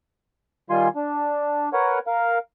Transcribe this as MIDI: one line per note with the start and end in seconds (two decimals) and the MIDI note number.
0.70 0.88 51
0.70 0.88 55
0.70 0.88 65
0.70 0.88 80
0.70 0.88 84
0.96 1.69 62
1.73 1.99 70
1.73 1.99 71
1.73 1.99 73
1.73 1.99 78
2.07 2.38 70
2.07 2.38 77